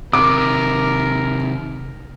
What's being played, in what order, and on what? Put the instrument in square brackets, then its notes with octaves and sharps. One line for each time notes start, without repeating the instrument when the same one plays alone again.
[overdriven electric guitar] C3 D#3 [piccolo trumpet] A#4 [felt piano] D6